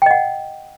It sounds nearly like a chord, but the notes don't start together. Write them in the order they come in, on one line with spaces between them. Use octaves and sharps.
G5 D#5 F#5